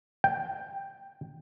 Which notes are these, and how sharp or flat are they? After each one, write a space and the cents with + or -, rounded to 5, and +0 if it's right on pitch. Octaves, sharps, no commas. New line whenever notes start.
G5 +5